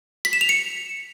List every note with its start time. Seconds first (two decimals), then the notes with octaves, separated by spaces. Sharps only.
0.25 B6
0.33 E7
0.41 F7
0.49 C#7